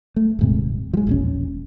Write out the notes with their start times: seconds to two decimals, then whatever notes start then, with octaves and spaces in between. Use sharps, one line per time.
0.16 A3
0.39 D#1 G#2 C3
0.94 F3 G#3
1.07 E1 A#1 C#4